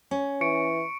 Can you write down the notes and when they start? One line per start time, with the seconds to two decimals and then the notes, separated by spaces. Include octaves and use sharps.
0.11 C#4
0.41 E3 C#6 C#7 D7